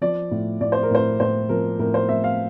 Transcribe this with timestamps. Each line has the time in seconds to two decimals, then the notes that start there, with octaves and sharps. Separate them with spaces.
0.01 F3 D5
0.31 A2
0.61 A2 D5
0.72 C5
0.83 A#4
0.91 A2 C5
1.20 A2 C5
1.49 F3 A#4
1.79 A2 A#4
1.94 C5
2.09 A2 E5
2.24 F5